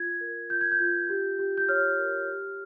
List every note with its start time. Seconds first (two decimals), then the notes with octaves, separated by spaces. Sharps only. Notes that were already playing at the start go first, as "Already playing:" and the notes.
Already playing: F4 G#6
0.21 A#4
0.50 F4 G6
0.61 G#6
0.72 G6
0.80 F4
1.09 G4
1.39 G4
1.57 G6
1.69 C#5 F6
1.98 A#4
2.28 G4